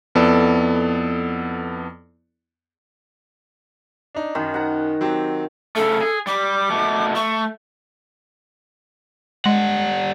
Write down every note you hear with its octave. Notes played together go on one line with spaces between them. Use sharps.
F2 B3 E4 A4 D5
D4 D#4
F#2 D#3
F#5 A#5
F#3 C4 G4
C#3 A3 A4
G#4
G3 D6
B2 A3
A3 C#6
G3 G#3 F#5